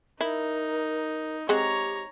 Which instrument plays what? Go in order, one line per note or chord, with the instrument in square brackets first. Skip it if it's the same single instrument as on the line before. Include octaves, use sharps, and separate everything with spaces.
[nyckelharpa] D#4 [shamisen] E4 [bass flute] A#4
[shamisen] G#3 C4 F#5 [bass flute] G4 [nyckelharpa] C#5 A#5